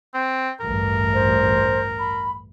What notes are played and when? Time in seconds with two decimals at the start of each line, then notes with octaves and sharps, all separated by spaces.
0.14 C4
0.60 A1 D2 G2 A#4
1.13 C5
1.99 B5